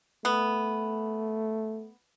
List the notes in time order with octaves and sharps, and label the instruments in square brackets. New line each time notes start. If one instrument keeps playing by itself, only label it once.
[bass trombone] A3 [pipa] B3